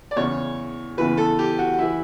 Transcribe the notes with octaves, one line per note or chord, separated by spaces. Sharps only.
D5
E2 C#3 E3 C#5
E2 C#3 E3 B4
A4
G4
F#4
E3 E4